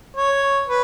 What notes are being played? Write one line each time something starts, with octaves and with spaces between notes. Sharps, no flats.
C#5
B4